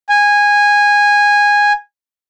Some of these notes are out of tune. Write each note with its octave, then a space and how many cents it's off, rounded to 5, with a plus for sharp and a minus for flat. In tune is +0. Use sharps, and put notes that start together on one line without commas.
G#5 -15